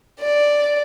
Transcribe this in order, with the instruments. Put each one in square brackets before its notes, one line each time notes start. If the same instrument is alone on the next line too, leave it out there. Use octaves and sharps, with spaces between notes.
[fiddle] D5